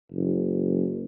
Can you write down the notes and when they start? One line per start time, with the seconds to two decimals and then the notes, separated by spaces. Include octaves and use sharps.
0.12 F#1